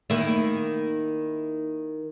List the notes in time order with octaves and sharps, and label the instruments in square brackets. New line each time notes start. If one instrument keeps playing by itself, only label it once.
[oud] D#3 A#3 E4